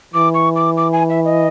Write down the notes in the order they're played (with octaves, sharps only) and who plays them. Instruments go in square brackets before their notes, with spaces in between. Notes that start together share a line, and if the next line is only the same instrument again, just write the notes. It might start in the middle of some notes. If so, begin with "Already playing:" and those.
[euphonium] E3 [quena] D6
[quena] C#6
D6
D6
G#5
E5
D#5